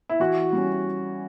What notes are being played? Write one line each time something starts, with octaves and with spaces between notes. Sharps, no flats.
E4
E3 F#4
G3 C#4